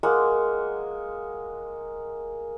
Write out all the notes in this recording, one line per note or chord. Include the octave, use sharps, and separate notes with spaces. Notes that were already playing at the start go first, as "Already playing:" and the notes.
G#3 A#3 F#5